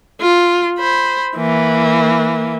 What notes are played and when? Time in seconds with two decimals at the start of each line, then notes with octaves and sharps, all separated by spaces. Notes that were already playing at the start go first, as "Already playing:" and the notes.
0.21 F4
0.79 C5 B5
1.37 E3 A#3